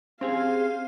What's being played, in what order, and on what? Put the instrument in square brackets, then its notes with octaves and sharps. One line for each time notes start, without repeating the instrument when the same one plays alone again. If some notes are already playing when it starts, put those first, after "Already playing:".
[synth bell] C4 G#4 [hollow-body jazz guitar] C#4 G4 G#5 [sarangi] F5